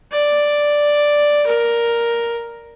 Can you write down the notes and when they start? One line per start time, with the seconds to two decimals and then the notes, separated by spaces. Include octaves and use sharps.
0.12 D5
1.46 A#4